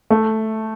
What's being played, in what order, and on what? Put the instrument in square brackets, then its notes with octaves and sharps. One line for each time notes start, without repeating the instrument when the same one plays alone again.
[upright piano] A3